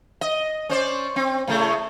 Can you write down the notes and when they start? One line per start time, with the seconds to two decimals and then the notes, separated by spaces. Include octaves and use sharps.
0.21 D#5
0.69 C#4 C5 D5
1.16 C4
1.48 A2 C#3 A3